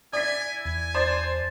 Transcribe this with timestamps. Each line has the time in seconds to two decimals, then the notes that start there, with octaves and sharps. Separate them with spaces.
0.13 E4 D5 G#5 B6
0.65 E2 G#5
0.95 C5 D5 A5